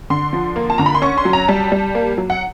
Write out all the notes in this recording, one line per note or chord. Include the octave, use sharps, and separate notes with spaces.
D3 C6
F3
A#3
A5
D3 A#5
B5
C6
C#4 C#6
C6
F#3
A#5
G3 A5
G3
A#3
F#3
F#5